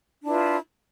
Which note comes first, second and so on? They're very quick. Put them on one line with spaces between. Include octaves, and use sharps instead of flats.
D4 E4 B4 F4